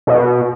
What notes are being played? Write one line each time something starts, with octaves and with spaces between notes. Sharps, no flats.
B2